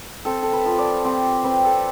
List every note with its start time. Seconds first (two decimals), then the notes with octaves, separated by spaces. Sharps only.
0.25 C4 A4
0.43 A4
0.53 B4
0.66 F3
0.79 D5
1.05 C4 G4
1.44 C4 B4
1.65 A4